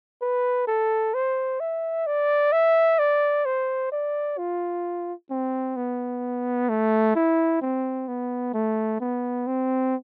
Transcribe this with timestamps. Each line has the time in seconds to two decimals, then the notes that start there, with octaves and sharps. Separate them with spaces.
0.22 B4
0.67 A4
1.14 C5
1.60 E5
2.07 D5
2.52 E5
2.99 D5
3.45 C5
3.92 D5
4.38 F4
5.30 C4
5.76 B3
6.69 A3
7.15 E4
7.61 C4
8.08 B3
8.54 A3
9.00 B3
9.47 C4